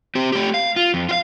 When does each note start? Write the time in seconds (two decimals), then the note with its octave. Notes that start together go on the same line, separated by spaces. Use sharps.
0.15 C4 G4
0.32 A3 G4
0.54 F5
0.76 F4
0.94 F2
1.09 F4 F5